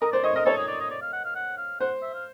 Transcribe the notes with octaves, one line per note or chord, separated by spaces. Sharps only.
A#4 D#5
C5 D5
C#5 D#5
A#4 D#5
A4 C#5
G#4
D5
D#5
D5
F5
F#5
F5
F#5
F5
C5 F#5
E5
F5